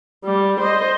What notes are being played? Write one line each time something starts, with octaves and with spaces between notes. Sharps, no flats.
G3
C5 D#5